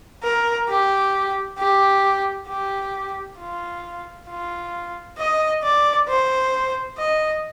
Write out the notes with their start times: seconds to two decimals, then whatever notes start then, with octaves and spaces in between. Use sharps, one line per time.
0.23 A#4
0.69 G4
1.58 G4
2.48 G4
3.38 F4
4.29 F4
5.18 D#5
5.63 D5
6.08 C5
6.98 D#5